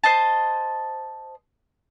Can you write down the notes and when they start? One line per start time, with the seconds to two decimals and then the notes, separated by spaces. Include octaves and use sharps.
0.04 C5 D#5 A5